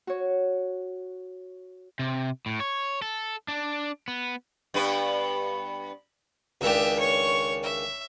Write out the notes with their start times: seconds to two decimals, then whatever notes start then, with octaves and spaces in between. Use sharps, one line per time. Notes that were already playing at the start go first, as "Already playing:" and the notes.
0.07 F#4 C#5
1.99 C3
2.46 A2
2.60 C#5
3.02 A4
3.48 D4
4.08 B3
4.74 G2 B3 B4
6.61 C#2 D#3 D4 G4 E5
6.99 C#5 C#6
7.63 E5